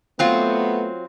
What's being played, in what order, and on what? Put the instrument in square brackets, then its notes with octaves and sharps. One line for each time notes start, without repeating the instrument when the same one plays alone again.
[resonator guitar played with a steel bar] F#3 C4 F4 [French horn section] A3 B3